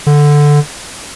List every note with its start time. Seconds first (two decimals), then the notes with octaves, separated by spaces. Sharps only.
0.07 D3